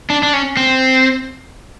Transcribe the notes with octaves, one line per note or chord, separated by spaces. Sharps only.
D4
D4
C#4
C4